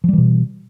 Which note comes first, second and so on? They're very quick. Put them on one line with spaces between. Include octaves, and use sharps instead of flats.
F3 G3 E3 B2